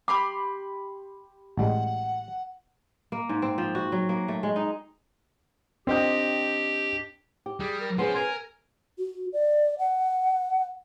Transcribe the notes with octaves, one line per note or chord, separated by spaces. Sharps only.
G4 B5 C6 D6
A1 G3 G#3 F#5
A#3
G#2
C4
F3
F#4
F#3
A#3
A3
G#3
D#4
C4 D4 G4 D#5 G5
G4
G3 G#4
A#4
F3 B3 C#4 G#4 C6
A#4 G#5
F#4
D5
F#5